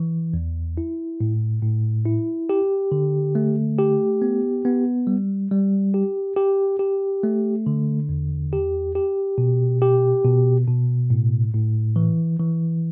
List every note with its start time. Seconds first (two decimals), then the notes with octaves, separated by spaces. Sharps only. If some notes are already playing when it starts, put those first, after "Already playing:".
Already playing: E3
0.33 E2
0.77 E4
1.20 A2
1.62 A2
2.06 E4
2.49 G4
2.92 D3
3.35 A3
3.78 G4
4.22 B3
4.65 B3
5.07 G3
5.51 G3
5.94 G4
6.37 G4
6.79 G4
7.23 A3
7.66 D3
8.09 E2
8.53 G4
8.95 G4
9.38 B2
9.82 G4
10.24 B2
10.67 B2
11.10 A2
11.54 A2
11.96 E3
12.39 E3